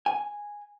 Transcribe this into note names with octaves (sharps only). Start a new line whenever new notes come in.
G#5